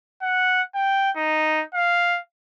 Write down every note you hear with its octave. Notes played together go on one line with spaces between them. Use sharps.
F#5
G5
D#4
F5